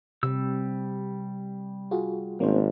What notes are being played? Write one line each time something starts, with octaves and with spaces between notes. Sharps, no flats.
C3 G3 E6
F4 F#4 G#4
G#1 A#3 C#4 C5